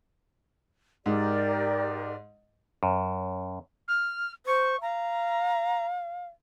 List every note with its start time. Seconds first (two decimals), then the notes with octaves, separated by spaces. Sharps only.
1.06 G#2 G4 A#4 D5
2.83 F#2
3.87 F6
4.46 C5 C#6
4.81 F5 A#5